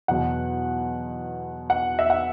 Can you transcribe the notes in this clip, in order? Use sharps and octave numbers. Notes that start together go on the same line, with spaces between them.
E2 B2 F#3 F#5
F#5
E5
F#5